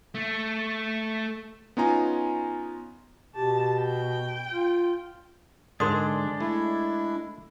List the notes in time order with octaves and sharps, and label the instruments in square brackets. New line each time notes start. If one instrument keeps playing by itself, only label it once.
[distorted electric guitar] A3
[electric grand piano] B3 C#4 D#4 F4 G#5 A#5
[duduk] B2 [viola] G4 A5
[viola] G5
[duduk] F4
[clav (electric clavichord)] G#2 D3 [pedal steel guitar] G#3 D4 [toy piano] A#4 C6 D#6
[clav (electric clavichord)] A3 [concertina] E4